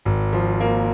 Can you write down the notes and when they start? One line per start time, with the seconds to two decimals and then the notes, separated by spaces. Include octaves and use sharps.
0.05 G#1
0.33 F3
0.60 A#3